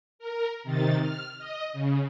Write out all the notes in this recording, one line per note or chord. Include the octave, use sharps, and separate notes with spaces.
A#4
C3 D#3 A6
F6
D#5
C#3